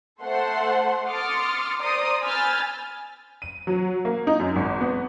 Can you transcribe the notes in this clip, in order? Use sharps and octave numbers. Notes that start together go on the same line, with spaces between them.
A3 A4 C5 F#5 C6
C6 D6 D#6 F6 A6 C#7
C5 D5 A#5 C6 D#6
G#5 B5 E6 F6 G6 A6
D#7
F#3
A#3
D#4
F#2
G#1
B3